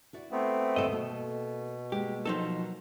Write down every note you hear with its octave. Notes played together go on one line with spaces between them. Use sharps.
E4 F#4 D5
A3 B3 C4
D#2 A2 C3 A4 D#5
B2 A3 A#3
G#3 A#3 G4
F3 F#3 D#4 A4 A#4